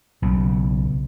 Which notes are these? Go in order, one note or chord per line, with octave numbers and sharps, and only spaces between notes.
B1 C#3